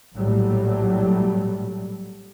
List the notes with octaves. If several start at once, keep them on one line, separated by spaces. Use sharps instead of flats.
A#1 A2 F#3 G3 A3